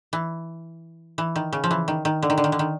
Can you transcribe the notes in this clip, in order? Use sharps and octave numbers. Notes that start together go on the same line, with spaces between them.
E3
E3
D#3
C#3
F3
E3
D#3
D#3
D3
D#3
D3
D#3
D3
D#3